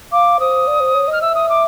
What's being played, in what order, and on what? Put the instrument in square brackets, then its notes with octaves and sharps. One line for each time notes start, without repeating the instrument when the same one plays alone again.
[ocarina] F5 [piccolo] D6
[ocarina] C5 [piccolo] D#6
[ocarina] D5
C5
C#5
[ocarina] D#5 [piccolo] F6
[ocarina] E5 [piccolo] E6
[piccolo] D#6
D6